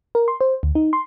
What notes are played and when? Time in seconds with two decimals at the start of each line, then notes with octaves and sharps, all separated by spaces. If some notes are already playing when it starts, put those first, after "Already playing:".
0.15 A#4
0.28 C6
0.41 C5
0.63 D2
0.75 D#4
0.93 C6